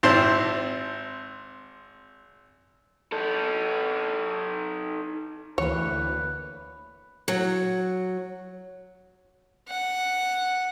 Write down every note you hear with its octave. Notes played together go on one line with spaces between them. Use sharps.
G#1 C4 E4 C5 A5 C6
D#4 A4
D2 E3 A#3 B4 C#5
F#3
F#5